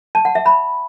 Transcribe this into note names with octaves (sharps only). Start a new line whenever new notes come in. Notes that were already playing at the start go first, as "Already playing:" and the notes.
A5
F#5
E5
B5